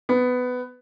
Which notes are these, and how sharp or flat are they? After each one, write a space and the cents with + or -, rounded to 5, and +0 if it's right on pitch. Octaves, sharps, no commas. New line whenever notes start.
B3 +15